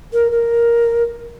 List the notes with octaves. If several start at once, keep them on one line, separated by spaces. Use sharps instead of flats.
A#4
A#4